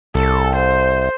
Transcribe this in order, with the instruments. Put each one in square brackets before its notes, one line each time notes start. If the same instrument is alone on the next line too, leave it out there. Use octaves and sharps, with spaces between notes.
[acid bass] C2 [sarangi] A4
[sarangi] C5